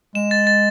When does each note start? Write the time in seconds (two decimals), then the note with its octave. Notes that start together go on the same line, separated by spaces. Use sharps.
0.15 G#3 E7
0.31 A6
0.47 A6